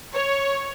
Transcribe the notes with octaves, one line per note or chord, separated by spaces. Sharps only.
C#5